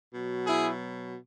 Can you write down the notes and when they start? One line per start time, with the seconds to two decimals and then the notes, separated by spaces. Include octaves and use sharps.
0.13 B2 F#3
0.46 E4 G#4